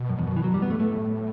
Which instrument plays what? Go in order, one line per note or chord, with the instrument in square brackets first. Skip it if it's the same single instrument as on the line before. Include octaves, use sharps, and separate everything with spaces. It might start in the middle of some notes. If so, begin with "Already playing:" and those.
Already playing: [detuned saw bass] B2
[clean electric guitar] F#2
E2
F#2
E3
F#3
G3
B3
[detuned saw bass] G2 [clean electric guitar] A3
[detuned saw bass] A2 [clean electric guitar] A3